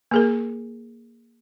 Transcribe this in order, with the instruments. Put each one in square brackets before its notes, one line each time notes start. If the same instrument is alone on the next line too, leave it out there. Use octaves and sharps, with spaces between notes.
[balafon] A#3 G#4 A#4